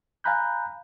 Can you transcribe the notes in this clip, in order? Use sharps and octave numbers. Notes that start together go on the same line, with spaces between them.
F5 G#5 A#5 B5 F#6 G6